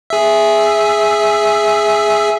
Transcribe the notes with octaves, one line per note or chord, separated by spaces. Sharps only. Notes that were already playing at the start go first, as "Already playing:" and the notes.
G#4 E5